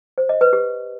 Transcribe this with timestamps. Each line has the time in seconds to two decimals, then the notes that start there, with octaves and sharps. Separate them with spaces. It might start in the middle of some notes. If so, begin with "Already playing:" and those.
0.18 C5
0.29 D#5
0.41 B4
0.53 G4